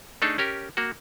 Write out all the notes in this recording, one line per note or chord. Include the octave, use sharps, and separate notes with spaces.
A3 D4 D#4 G#4 A4
C#4 G4 A#4
A#3 F#4